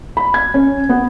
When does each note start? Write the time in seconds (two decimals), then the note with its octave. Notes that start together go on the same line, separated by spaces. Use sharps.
0.17 B5
0.34 G#6
0.54 C#4
0.89 B3